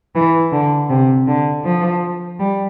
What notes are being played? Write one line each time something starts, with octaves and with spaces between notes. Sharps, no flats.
E3
D3
C3
D3
F3
G3